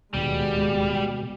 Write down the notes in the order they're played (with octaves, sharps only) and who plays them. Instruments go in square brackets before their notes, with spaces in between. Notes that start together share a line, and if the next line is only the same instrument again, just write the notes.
[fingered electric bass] D1 D#2 D#3 [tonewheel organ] B2 [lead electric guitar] G3 [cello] G#3 B3